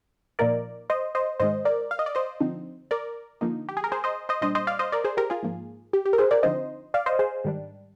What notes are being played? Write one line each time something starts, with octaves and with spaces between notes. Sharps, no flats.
A#2 F3 A#3 D#4 A#4 D5
C5 D#5
C5 D#5
G#2 D#3 G#3 C5 D#5
A#4 D5
F5
D#5
D5
C5 D#5
D3 F3 C4 D#4
A#4 D5
D3 F3 A#3 D#4
G4
G#4
A#4
G#4 C5
C5 D#5
C5 D#5
A#2 G3 D4 C5 D#5
C5 D#5
D5 F5
C5 D#5
A#4 D5
G#4 C5
G4 A#4
F4 G#4
G#2 F3 A#3
G4
G4
A#4
G#4 C5
A#4 D5
D3 F3 C4 D#4 C5 D#5
D5 F5
C5 D#5
G#4 C5
G#2 D#3 G3 D4